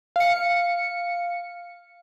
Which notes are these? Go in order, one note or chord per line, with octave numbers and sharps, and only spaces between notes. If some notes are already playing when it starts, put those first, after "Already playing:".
F5 C#7